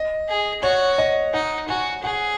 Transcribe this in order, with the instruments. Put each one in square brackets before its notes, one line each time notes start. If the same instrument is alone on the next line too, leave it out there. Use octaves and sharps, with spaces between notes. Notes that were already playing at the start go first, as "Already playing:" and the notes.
Already playing: [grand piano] D#5
[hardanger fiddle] G#4
[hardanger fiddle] F#4 [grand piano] C#5
[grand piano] D#5
[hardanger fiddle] D#4 [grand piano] F#5
[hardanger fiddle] F#4 [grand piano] G#5
[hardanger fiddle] G#4 [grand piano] F#5